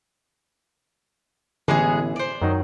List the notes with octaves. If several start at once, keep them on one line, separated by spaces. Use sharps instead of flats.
A1 D3 E3 G#3 B3 G#4
C5 D5
F#2 D#3 F#3 D#4